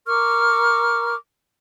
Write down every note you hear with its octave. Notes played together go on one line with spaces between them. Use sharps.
A#4 C#6 D6 F6